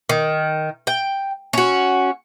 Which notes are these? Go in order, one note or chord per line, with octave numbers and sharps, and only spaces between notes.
D#3
G5
C#4 F#4